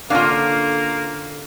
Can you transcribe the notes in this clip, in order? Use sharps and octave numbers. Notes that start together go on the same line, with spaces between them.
D3 A#3 C#4 D4 F4 A4 F5